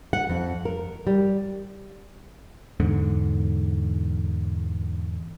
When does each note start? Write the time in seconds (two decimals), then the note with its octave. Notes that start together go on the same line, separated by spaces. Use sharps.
0.13 F#5
0.30 F2
0.65 A#4
1.07 G3
2.80 E2 G#2 D3